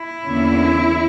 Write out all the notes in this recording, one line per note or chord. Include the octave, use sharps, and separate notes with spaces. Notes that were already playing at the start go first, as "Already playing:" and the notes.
Already playing: E4
E2 D3 A#3 C#4